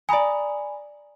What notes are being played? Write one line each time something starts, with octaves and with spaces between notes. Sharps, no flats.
D5 G#5 A#5 B5 D#6